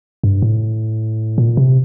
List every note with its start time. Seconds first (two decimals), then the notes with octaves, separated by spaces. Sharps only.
0.24 G2
0.42 A2
1.38 A#2
1.57 C3